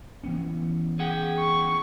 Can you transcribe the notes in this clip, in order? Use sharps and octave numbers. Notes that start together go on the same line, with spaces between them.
E3 B3 C#4
G#4 F#5 G5
C#6